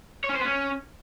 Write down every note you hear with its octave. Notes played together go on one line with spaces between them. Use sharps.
C#5
C#4
C5
B3
C#4